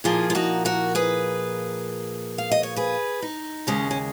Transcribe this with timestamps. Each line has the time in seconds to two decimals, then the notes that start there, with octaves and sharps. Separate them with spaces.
0.04 A#2 F3 A#3 F4 G#4
0.30 F4
0.35 D#4 F#4
0.65 F#4 A#4
0.95 G#4 B4
2.38 F5
2.51 D#5
2.63 C#5
2.76 G#4 B4
3.22 D#4
3.67 D#2 C#3 G#3 C#4
3.91 C#4